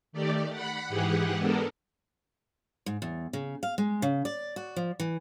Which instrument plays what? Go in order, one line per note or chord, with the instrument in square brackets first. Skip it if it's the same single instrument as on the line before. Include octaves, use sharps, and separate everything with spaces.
[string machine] D#3 A3 G4 D5
F#5 B5
G#2 E3 G4 G#4 F#5
G#3 B3 D4 A4 A#4
[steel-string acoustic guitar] G#2
E2
C#3
F5
G#3
C#3
D5
F#4
F3
E3